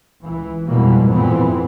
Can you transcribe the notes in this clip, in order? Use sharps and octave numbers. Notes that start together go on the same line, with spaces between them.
C#2 E3
F2 G#2 B2 E3 G3 A#3
F2 A#2 E3 B3 C4